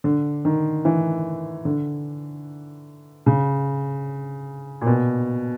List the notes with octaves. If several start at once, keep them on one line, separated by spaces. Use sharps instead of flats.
D3
D#3
E3
D3
C#3
A#2
B2